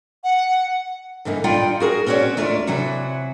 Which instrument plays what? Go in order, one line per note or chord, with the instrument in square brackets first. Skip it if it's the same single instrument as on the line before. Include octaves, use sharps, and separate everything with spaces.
[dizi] F#5
[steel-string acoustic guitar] G2 D3 E3 A#3 D#4
G3 D#4 F4 D5 F#5 G5
F#4 G#4 A#4
C4 C#4 F#4 A4 C#5 D5
D#2 A3 D4 F4 D5
C3 E3 F#3 F#4